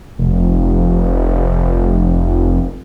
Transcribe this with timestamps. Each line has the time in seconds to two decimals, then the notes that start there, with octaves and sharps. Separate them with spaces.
0.19 F1
0.85 F1